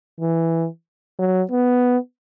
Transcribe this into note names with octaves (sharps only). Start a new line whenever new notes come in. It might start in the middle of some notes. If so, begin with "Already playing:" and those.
E3
F#3
B3